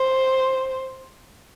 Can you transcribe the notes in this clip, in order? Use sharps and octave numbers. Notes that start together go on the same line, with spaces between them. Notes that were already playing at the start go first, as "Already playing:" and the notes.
Already playing: C5